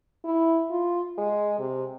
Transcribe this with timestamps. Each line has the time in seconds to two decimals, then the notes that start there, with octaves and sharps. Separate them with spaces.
0.24 E4
0.70 F4
1.18 G#3
1.59 C3